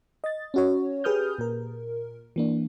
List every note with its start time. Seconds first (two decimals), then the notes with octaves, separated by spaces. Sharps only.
0.24 D#5 A6
0.54 C#4 F#4 C#5
1.04 G4 G#4 B4 D#6 F6 G6
1.38 A#2 A#4
2.36 E3 A#3 D4